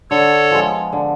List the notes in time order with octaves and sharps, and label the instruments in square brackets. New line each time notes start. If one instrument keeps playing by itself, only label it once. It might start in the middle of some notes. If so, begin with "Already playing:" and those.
[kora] D3 [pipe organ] A4 C#5
[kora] F3 G#3 B3
D3